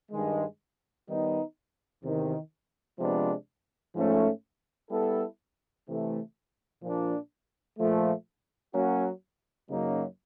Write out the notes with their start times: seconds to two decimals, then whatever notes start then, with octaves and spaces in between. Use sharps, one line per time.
0.11 G2 D#3 G#3
1.07 D#3 G3 B3 D#4
2.03 E2 C3 D#3
2.99 C3 F3 G#3 B3 D4
3.95 G#2 F3 A3 C#4
4.90 G3 B3 E4 A4
5.87 C3 E3 A3
6.83 A#2 F3 A#3 D4
7.78 A#2 F3 A3
8.74 F#3 A#3 C#4 F#4
9.70 F#2 C#3 F#3 A#3 D#4